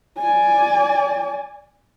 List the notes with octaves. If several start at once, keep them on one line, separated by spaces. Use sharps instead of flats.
D5 G#5